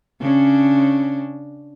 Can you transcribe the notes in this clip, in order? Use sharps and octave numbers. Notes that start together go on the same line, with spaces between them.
C#3 C#4 D4